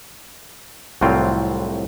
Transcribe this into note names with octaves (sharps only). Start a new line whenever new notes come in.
C2 A2 F#3 C4 F4 G5